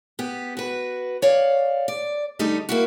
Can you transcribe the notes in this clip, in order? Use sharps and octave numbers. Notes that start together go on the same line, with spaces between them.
B3 G4
F#4 B4
C#5 D5 F5
D5
D3 G3 A3 D#4 A4
A#3 E4 F#4